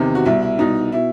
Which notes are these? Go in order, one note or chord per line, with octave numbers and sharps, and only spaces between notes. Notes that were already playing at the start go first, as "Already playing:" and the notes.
Already playing: E2 C3 D#3
F#4
C2 B2 E4
E4
C2 B2 D#4
B2 E4